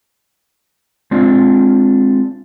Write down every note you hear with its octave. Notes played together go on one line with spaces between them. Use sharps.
G#3 C4 D4 F4